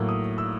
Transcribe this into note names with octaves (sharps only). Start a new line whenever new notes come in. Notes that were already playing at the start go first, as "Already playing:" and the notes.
Already playing: A2 F#3 A#3
D#6
E6